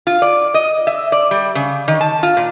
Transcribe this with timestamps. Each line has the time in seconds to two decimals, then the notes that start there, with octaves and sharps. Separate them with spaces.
0.07 F4
0.22 D5
0.54 D#5
0.87 E5
1.12 D5
1.31 G3
1.55 C#3
1.88 D#3
2.01 A5
2.23 F4
2.37 A#2